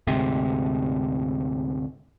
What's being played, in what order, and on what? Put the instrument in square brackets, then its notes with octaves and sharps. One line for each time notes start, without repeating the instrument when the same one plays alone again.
[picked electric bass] D2 G#2 C3